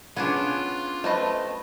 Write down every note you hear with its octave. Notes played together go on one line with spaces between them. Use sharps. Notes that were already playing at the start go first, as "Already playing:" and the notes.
B3 C#4 D4 F4 G#4
A3 C4 B4 D#5 A5